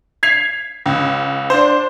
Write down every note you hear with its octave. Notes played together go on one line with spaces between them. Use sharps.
G#6 B6 C7 F7
C#2
D4 C5